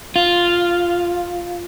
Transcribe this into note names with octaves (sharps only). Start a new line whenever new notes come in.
F4